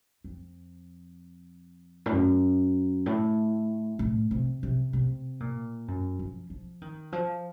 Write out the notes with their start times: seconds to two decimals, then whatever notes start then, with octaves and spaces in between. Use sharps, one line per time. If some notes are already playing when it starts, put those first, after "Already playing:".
0.24 F2
2.06 A2
2.12 F#2
3.06 A2
3.99 A2
4.31 C3
4.63 C3
4.93 C3
5.40 A#2
5.88 F#2
6.19 F3
6.50 F3
6.82 D#3
7.12 F3